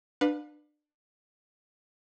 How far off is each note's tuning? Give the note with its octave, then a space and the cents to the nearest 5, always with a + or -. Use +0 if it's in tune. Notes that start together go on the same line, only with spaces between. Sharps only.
D4 +30 B4 +0 F5 +40